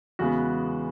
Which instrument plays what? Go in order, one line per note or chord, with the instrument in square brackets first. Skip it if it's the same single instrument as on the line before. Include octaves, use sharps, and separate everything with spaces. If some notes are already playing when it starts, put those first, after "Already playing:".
[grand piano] E2 C#3 G#3 B3 F#4